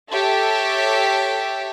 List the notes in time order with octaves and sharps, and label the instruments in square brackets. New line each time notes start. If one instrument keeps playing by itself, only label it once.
[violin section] G4 A4 C#5 E5